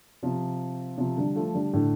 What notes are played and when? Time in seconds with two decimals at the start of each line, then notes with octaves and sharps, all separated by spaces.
0.23 C3 F3
0.98 C3 F3
1.17 D3 G3
1.36 F3 A3
1.54 D3 G3
1.73 A2 D3